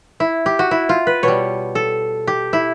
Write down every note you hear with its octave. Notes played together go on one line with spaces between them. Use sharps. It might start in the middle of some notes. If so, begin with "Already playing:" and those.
E4
G4
F#4
E4
F4
B4
B2 G3 C#5
A4
G4
E4